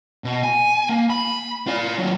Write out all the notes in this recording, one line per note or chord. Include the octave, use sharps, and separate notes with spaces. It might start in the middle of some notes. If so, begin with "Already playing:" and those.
B2
G#5
A#3
B5
F4 D5
D#2 F#3